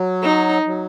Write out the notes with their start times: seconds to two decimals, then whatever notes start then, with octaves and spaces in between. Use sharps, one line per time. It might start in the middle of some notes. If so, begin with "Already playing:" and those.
Already playing: F#3
0.23 D#4
0.67 F#3